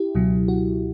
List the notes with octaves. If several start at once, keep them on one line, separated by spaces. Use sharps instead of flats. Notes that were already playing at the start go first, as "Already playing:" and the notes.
Already playing: E4 G4
C#2 B2 F#3
F#4